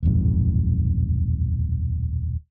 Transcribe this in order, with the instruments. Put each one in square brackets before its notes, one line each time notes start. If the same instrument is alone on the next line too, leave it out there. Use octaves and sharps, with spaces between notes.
[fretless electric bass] D#1 B1 F2 G#2